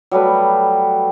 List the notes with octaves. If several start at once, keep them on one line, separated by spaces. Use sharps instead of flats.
F#3 G3 A3 B4